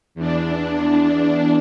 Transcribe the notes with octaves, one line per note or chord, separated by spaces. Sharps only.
E2 D4